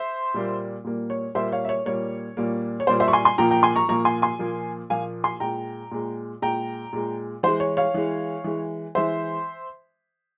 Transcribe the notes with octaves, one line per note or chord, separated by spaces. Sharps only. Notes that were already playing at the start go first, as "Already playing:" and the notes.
Already playing: C5 E5
A#2 G3 A#3
A#2 G3 A#3
C#5
A#2 G3 A#3 C5 E5
C#5 F5
E5
C#5
A#2 G3 A#3 C#5
A#2 G3 A#3
C#5
A#2 G3 A#3 C5
C5 E5
C#6
G#5 C6
G#5 C6
A#2 F3 A#3 G5 A#5
G5 A#5
G#5 C6
A#5 C#6
A#2 F3 A#3 A#5 C#6
G#5 C6
G#5 C6
A#2 F3 A#3
A#2 F3 A#3 F5 G#5
G#5 C6
A#2 G#3 G5 A#5
A#2 G#3
A#2 G#3 G5 A#5
A#2 G#3
E3 G#3 C5
C#5
C#5 F5
E3 G#3
E3 G#3
E3 G#3 C5 E5